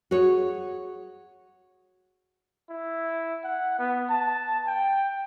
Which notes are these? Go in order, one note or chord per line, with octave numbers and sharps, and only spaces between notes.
F#4 G#4 C#5
E4
F#5
B3
A5
G5